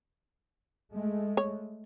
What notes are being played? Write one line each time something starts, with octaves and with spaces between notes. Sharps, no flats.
G#3 A3
C#5